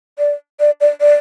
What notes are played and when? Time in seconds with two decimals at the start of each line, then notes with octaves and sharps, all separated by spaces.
0.19 D5
0.60 D5
0.81 D5
1.01 D5